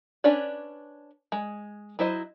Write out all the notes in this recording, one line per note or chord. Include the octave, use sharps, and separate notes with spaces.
C#4 D4 B4 C#5 D5
G#3
F#3 E4 C5 D#5